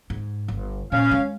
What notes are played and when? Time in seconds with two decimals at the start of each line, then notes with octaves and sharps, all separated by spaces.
0.10 G#2
0.48 G1
0.92 A#2 C#4 F5
1.11 G#3